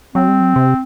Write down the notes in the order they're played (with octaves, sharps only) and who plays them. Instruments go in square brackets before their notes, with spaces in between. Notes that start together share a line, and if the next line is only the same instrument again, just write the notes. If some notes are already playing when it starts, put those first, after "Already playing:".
[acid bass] F#3 [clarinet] C4
[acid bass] G3
F#3
C3